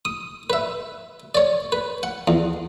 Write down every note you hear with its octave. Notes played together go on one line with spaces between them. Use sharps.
D#6
B4 E5
C#5 D5
B4
F#5
E2